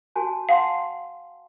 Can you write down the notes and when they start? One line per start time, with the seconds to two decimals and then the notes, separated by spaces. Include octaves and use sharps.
0.16 F#4 G#5 A5
0.49 F5 F#5 A5 C6